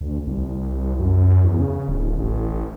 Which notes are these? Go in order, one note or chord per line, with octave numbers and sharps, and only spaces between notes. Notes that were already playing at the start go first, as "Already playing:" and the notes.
D2
C2
F#2
E2
C#3
D1
A1